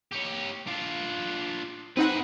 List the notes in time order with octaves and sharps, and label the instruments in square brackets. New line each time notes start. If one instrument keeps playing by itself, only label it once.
[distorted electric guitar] G4 C#5
D4 F4
[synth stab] C4 D#4 F#5 [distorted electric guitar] G#4 B4